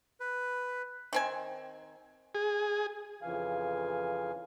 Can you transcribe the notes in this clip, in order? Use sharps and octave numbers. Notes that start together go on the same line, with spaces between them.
B4
D#3 C4 G#5
G#4
F2 C#3 E3 F3 F5 G#5